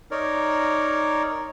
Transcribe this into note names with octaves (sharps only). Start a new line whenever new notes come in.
D#4 A#4 C#5 D5